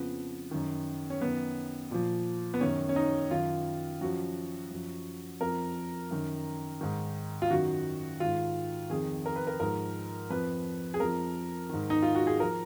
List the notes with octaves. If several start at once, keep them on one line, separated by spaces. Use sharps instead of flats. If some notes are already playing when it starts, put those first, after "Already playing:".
Already playing: F2 C#3 F3 B3
F#2 D#3
C#4
F#2 D#3 B3
A#2 F3
B3
F#2 D#3 C#4
C#4
D#4
F#2 D#3 F4
F#2 F3 F#4
F#2 F3
F2 F3 A#4
F#2 D#3
G#2 D#3
F4
F#2 D#3 F#4
G#2 D#3 F4
F2 D#3 G#4
A#4
B4
A#4
G#2 F3 A#4
F2 F3 B4
G#4
F2 F3 A#4
G#2 D#3
D#4
F4
F#4
G#4
F3 A#4